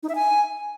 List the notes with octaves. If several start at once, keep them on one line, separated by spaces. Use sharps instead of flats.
D#4
E5
G#5